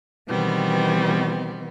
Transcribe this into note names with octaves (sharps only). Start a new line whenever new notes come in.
B2 D#3 E3 G3 B3 C4